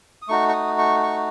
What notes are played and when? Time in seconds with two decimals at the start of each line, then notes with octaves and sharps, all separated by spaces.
0.22 D#6
0.28 A3 D#4 F#4 C#6
0.49 C#6
0.53 D#6
0.78 C#6
1.03 C#6